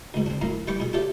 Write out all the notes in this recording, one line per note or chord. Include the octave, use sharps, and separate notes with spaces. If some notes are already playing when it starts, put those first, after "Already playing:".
D2 G#2
C4 D4
F#2 A2 F5 A#5
E3 G3 G5 C#6 D6
B2 G#4
F4 G4 A4 C#5 D5 E5